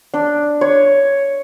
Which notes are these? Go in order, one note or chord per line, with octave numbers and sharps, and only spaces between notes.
D4
C#5